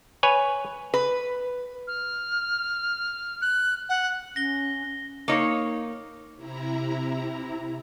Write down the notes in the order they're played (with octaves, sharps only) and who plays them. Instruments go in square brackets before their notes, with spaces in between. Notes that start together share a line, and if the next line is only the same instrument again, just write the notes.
[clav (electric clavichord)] B4 C#5 G#5
[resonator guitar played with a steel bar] B4
[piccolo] F6
[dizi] F#6
F#5
[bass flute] C#4 [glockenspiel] A#6 G7
[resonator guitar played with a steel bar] A#3 D#4 C#5
[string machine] C3 E4 A#5